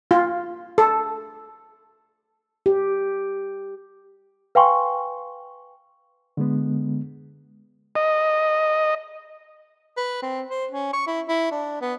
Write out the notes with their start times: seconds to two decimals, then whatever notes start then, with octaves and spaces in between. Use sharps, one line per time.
0.11 F4
0.78 A4
2.66 G4
4.55 B4 F5 G5 G#5 C6 C#6
6.37 D3 G#3 B3
7.95 D#5
9.97 B4
10.22 C4
10.50 C5
10.71 C#4
10.93 C#6
11.07 E4
11.28 E4
11.51 D4
11.82 B3